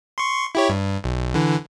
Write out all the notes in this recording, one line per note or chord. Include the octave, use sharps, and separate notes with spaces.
C6 C#6
E4 G4 C#5
G2
B1
D3 E3